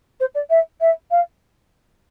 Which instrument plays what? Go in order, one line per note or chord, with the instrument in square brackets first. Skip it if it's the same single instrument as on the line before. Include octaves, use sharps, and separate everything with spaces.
[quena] C5
D5
E5
E5
F5